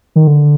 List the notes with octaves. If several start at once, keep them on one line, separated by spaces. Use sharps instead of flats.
D#3
D3